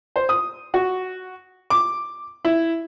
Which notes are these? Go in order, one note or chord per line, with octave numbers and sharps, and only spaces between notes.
C5
D#6
F#4
D6
E4